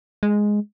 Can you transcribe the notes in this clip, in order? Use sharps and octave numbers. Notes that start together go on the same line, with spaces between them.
G#3